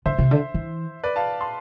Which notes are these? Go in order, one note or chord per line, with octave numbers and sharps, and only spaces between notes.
D3 C5 E5
C3
D3
E3
B4 D5
F5 A5
A5 C6